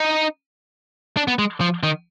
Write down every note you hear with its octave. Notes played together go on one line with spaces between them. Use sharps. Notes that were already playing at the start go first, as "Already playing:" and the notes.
Already playing: D#4
D4
B3
G#3
F3
D#3